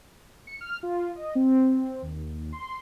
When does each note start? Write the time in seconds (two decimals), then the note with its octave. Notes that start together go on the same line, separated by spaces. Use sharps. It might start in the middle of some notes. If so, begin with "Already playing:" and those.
0.47 C#7
0.61 F6
0.83 F4
1.16 D#5
1.35 C4
2.02 D#2
2.52 C6